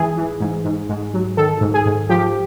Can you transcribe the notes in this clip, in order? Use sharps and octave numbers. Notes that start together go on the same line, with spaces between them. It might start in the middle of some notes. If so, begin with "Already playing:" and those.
Already playing: G#2 E3 G#4
E3
G#2
G#2
G#2
F#3
D#3 A4
G#2
G#4
G#2
F3 G4